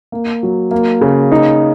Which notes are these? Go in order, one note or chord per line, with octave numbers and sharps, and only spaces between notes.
A#3
F#3
A#3
C#3
D#4